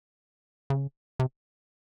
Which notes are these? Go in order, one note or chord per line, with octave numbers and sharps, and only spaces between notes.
C#3
C3